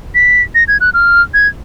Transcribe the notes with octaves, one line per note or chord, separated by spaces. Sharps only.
B6
A#6
G#6
F#6
F6
G#6